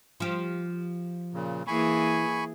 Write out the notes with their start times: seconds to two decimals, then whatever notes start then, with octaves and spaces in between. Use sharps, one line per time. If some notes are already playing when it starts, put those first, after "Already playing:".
0.20 F3 G4
1.33 A#2 C#3
1.67 E3 A#3 G#4 G#5 B5 C#6